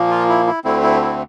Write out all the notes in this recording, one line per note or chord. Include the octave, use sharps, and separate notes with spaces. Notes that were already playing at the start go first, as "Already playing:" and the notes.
Already playing: A#2 F3 A#3
F4
E4
E4
D2 D3 A3 C4 E4
E4
E4